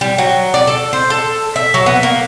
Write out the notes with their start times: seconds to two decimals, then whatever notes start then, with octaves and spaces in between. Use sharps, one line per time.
0.01 G3
0.18 F#3
0.54 D5
0.67 A4
0.93 C5
1.10 A4
1.56 E5
1.74 F#3
1.86 B3
2.03 A#3